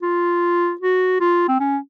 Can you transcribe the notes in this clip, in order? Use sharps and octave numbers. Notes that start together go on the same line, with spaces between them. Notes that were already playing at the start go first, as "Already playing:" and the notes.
F4
F#4
F4
C4
C#4